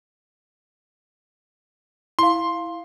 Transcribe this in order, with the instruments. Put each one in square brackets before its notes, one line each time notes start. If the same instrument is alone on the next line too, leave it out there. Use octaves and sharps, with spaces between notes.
[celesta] E4 F5 [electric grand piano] C6